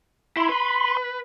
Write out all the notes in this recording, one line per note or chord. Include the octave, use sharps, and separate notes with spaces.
E4 B5 C6
B4